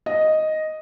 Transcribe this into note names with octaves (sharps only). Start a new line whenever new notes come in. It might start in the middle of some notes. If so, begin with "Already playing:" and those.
D#5